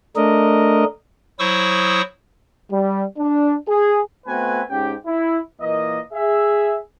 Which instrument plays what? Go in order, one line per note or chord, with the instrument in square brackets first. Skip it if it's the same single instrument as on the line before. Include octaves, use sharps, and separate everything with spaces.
[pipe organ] A3 D4 A#4 D#5
F#3 E4 C5 C#6 D#6 E6
[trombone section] G3
D4
G#4
[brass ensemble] A3 B3 C4 F#4 B4 G#5
G#2 C#4 G4 G5
E4
A#2 E3 A#3 D#5
G#4 E5